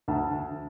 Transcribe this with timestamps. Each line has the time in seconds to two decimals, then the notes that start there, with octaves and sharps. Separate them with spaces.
0.08 D2 A5
0.43 D3